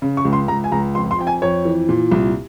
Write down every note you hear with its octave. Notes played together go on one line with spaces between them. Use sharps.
C#3
C#6
C#2
C6
C#2 A#5
G#5
C#2 A#5
F2 C6
C6
F2 G5
G#5
F2 C#5
E3
A#2
C2